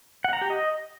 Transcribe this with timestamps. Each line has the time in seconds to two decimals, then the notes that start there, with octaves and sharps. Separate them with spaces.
0.24 F#5
0.33 A#5
0.41 G4
0.50 D#5